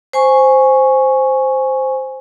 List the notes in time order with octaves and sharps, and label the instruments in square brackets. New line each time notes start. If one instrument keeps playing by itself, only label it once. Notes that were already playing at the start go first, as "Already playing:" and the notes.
[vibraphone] C5 G#5 C#6